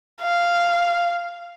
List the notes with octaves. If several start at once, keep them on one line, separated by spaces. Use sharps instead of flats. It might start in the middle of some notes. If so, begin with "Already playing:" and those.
F5